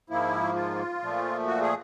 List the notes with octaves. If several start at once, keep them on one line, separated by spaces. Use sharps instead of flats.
G#2 F3 A#3 E4
F4
A#2 F3 A3
F#4
G#4